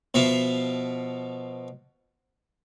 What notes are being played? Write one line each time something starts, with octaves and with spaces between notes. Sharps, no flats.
B2 F3 E5 F5